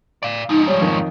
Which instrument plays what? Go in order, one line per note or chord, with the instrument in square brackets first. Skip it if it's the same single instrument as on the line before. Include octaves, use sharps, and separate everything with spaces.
[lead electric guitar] D5 F5
[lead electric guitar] G#2 F3 [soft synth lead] D#4
[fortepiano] G3 [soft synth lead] C#5
[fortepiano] F2 D#3